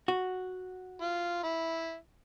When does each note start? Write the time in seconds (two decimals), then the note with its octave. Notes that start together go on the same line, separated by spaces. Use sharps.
0.08 F#4
1.02 F4
1.44 E4